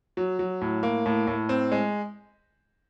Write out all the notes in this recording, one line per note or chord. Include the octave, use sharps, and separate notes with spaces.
F#3
F#3
A2
A#3
A2
A2
C4
G#3